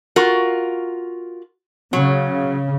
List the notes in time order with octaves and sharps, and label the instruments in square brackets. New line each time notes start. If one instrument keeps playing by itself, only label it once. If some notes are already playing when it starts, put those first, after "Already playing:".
[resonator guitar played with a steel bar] F4 F#4 A#4
[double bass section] C#3 [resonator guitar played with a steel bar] F#3